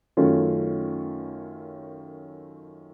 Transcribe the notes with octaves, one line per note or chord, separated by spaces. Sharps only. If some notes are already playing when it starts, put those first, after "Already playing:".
F#2 D#3 A3 C#4 F4